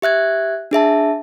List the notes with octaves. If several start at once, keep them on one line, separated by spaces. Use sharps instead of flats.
G4 E5 F#6 G#6
D4 G#4 E5 A5